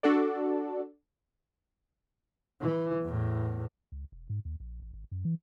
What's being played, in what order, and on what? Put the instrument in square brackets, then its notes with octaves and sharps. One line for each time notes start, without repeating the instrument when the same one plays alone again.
[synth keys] D4 F#4 A4 D5
[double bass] E3
E2 A2
[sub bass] C#2
E1
G#2
D#2
A#1
A1
G#1
F#2
E3